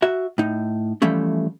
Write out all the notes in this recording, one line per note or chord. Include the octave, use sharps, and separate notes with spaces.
F#4 E5
A2 D#4
E3 F3 G3 A3 C#4